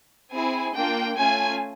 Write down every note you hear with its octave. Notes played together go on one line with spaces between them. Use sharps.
C4 E4 G#4 G#5
A#3 D4 F4 G5
A3 C#4 F4 G#5